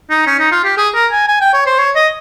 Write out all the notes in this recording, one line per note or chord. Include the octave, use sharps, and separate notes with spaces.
D#4
C#4
D#4
F4
G4
G#4
A#4
G#5
G#5
G5
C#5
C5
C#5
D#5